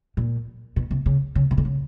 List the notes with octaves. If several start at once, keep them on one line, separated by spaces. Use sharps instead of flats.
A#2
B2
C3
C#3
C#3
C3
D3
C#3